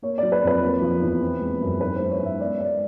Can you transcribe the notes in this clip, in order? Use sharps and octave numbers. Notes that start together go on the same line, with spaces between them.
A#3 C#5
F#3 D5
B4
F2 B4
A#3
F3
E2
C4
G#3
F#2
G#2 B4
G#3 C5
C#5
G#2 E5
B3 D5
G#3 D5